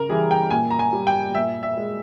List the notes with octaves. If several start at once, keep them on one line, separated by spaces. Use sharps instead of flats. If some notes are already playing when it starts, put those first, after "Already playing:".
Already playing: C#3 A#4
E3 G3 G#4
G5
A#2 G#5
A#5
G#5
G3
G5
A#2 E5
E5
G#3